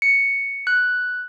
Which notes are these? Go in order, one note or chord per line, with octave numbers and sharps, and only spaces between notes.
C#7
F#6